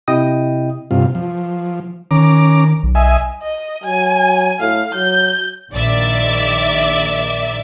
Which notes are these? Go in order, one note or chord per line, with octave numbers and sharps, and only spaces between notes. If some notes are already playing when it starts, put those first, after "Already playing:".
C3 E4 D#5 G5 D#6
G2 C3 F4
F3
D#3 C#4 A#5 D6
B1
D#5 E5 G#5
D#5
F#3 G#5
A2 F5
F#3 G6
A#1 D#3 D5 E5